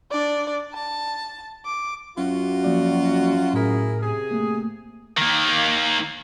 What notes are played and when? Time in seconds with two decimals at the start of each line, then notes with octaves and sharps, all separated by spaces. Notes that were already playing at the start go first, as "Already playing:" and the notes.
0.11 D4 D5
0.74 A5
1.66 D6
2.18 F#2 F4 F#4
2.64 F3 A#3 D5
3.54 A2 E4 G#4 A#4
4.01 C3 G#4
4.31 A3 A#3
5.17 D#3 A#3